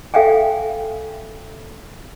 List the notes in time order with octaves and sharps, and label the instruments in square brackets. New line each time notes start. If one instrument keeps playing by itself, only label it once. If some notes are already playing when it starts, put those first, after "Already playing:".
[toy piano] A4 E5 F5 G5 G#5